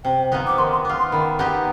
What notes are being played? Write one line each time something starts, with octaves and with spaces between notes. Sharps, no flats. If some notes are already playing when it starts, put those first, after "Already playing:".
C3 G5
F3 B3 D#4
D6
D#3 C6
C6
B3 F4 D6
C6
D#3 B5
B3 D#4 G4